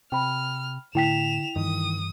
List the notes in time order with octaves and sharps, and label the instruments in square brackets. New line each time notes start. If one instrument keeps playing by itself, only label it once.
[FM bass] C3 [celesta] G5 B5 [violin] F6
[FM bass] A2 [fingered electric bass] D3 [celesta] E4 G5 B6 [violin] E7 F7
[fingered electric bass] G2 E3 [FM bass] D#3 [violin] D#6